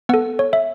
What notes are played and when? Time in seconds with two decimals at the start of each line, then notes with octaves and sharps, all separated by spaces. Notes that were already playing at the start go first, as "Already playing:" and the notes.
0.09 B3 F#5
0.14 A4
0.39 C#5
0.53 E5